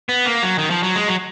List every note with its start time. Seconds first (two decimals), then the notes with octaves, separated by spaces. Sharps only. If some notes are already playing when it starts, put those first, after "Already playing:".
0.09 B3
0.26 A#3
0.42 F#3
0.58 D#3
0.70 F3
0.83 F#3
0.96 G#3
1.08 F#3